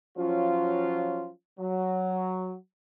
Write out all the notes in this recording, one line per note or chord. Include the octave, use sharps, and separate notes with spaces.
F3 F#3 C#4 F4
F#3